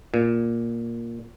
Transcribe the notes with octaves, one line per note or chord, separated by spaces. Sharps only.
A#2